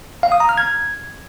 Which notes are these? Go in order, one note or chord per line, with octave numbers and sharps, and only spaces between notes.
F5
D#6
A#5
F6
G#6